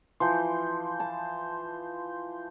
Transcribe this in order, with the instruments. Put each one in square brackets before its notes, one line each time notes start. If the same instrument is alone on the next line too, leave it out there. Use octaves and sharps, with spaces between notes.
[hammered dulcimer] E3 F3 [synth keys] C6 G6
[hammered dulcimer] A5